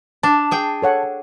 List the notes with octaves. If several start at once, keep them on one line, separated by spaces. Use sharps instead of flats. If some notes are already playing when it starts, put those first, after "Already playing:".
D4 A5
G#4 G5
A4 C#5 F#5